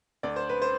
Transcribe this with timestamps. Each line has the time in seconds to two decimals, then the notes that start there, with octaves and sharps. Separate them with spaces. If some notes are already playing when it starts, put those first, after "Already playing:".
0.23 D2 D5
0.36 C5
0.49 B4
0.62 C5